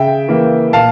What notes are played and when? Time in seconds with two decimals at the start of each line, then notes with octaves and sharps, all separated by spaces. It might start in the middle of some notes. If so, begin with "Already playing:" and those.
Already playing: C#3 E5 G5
0.28 E3 A#3
0.73 A#2 F5 A5